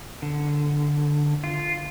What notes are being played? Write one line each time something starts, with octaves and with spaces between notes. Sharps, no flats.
D3
F4